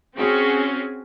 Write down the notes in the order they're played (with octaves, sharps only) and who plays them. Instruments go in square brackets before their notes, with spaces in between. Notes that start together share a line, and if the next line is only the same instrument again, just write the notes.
[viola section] C4 C#4 [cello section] F#4 G#4